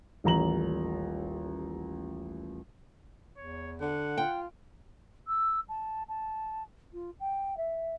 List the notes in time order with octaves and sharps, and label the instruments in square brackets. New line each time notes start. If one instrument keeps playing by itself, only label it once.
[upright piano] D#1 A1 A#5 F#7
[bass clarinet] E2 [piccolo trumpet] C#5
[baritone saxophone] D3 [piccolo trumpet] F#5
[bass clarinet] F4 [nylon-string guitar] G5
[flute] E6
A5
A5
F4
G5
E5